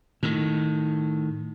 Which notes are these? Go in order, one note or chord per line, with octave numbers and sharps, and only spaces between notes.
A2 D#3